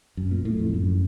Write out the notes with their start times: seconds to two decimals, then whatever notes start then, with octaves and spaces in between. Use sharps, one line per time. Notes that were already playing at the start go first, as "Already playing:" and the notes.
0.17 F#2
0.31 A#2
0.45 A2
0.59 F2
0.74 F#2